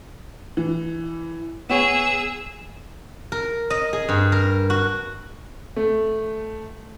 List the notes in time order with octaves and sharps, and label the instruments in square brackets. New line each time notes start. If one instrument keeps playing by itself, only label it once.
[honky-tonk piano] E3
[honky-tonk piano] B3 C#5 [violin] G#4 E6
[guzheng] A#4
D#5
G#4
G2
A#4
F#4
[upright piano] A3